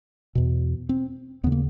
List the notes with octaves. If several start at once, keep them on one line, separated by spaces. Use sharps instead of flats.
E2 B2
C4
D#2 C#3 B3
A#3